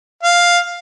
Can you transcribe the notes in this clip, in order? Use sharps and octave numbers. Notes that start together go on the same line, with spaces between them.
F5